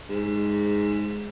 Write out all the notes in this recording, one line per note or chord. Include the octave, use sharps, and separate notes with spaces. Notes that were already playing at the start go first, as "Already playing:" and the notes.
G#2